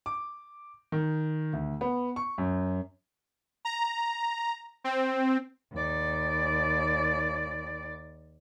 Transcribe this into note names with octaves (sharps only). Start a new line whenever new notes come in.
D6
D#3
D2
B3
C#6
F#2
A#5
C4
D#2 D5